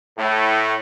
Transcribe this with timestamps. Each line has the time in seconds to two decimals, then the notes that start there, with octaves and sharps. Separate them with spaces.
0.18 A2